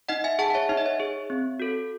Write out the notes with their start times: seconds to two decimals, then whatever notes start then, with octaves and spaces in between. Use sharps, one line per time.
0.09 D#4 D#5 F#5
0.24 E5 G#5
0.39 G#4 F#5 A5
0.50 F#5
0.54 C#5 E5
0.69 D#4 E5
0.77 D#5
0.86 C#5 E5
1.00 G#4
1.30 C4
1.60 F#4 A4